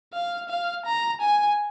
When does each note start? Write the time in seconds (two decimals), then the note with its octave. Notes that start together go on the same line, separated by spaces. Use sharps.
0.13 F5
0.49 F5
0.86 A#5
1.21 G#5